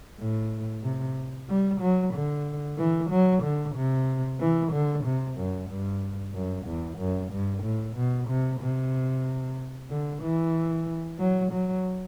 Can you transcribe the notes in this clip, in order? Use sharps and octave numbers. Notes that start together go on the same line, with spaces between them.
A2
C3
G3
F#3
D3
E3
F#3
D3
C3
E3
D3
C3
F#2
G2
F#2
E2
F#2
G2
A2
B2
C3
C3
D3
E3
F#3
F#3